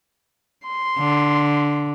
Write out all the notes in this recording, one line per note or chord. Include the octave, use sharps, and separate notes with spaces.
C6
D3